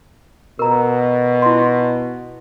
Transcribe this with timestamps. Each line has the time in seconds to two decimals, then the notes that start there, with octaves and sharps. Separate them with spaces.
0.59 B2 A#4 A#5
1.42 E4 C6